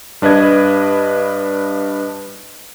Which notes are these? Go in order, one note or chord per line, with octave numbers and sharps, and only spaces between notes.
G2 D4 B4 D#5 G#6